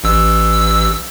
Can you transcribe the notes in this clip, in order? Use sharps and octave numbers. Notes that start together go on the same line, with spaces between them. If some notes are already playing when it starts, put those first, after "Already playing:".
A1 E6